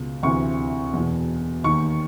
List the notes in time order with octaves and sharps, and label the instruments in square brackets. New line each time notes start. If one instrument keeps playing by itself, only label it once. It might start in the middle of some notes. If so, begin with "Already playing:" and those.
Already playing: [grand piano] C#2 B2
D2 C3 E3 C#6
E2 B2
D#2 D#3 C#6